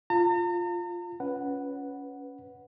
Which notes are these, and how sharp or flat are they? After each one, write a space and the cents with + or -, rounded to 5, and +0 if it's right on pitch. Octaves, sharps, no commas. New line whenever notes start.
F4 +0 A#5 -45
C#4 +15 B4 +0 F#5 +0